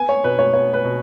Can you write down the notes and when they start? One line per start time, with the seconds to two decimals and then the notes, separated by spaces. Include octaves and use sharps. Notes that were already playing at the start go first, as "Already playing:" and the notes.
Already playing: B3 G#5
0.09 C#5
0.24 B2 B4
0.39 C#5
0.53 B3 C#5
0.74 B4
0.85 B2